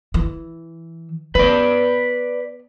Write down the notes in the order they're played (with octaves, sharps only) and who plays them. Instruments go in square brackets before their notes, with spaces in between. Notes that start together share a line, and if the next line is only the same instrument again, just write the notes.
[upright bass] E3
[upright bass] B3 [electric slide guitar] B4 D5